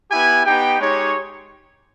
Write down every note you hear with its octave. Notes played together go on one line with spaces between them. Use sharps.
B3 E4 G4 G#5
B3 D#4 G4 G5
G#3 D#4 G4 C#5